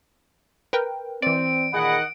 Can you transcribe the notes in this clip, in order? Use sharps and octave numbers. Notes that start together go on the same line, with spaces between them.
A#4 B4 G5
E3 C4 D5 D7
A#2 D#3 G#4 D#5 F#5 B5